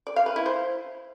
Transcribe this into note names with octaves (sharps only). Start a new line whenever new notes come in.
D5
F5
B4
E4
C5